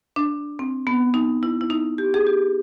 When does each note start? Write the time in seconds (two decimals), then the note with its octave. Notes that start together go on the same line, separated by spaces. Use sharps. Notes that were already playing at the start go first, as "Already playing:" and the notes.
0.16 D4
0.59 C4
0.87 B3
1.14 D#4
1.43 E4
1.61 E4
1.70 D#4
1.98 G4
2.14 G#4
2.27 G4